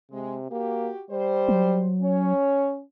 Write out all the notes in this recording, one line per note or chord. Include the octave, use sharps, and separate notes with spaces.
C3 G#3
A#3 F#4 G4
G3 C5
F#3
C#4 C#5